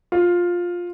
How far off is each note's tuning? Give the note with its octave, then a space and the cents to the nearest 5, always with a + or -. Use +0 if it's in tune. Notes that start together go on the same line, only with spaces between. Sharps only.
F4 +10